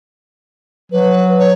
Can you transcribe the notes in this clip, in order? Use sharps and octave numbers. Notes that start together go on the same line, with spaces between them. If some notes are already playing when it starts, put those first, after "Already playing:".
F#3 B4
C#5